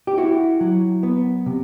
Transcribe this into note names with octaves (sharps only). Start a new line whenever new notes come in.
G4
E4 F#4
F#3
B3
C3